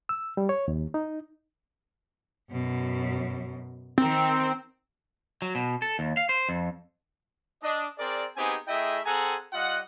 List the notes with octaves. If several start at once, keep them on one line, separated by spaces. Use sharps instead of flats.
E6
G3
C#5
D#2
D#4
F#2 B2
D#3 C4 A#4
F#3
B2
A4
D#2
F5
C5
F2
D4 D#5
C4 G#4 A#4 D5
B3 C4 D#4 G4 G#4 G#5
A3 E4 G#4 D#5 E5 G5
C4 G#4 A4 F#5 G#5 A#5
G3 F4 D#5 F#5